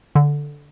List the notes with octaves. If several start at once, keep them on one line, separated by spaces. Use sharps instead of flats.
D3